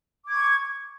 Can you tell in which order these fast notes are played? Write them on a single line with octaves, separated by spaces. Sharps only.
D6 G#6 C#6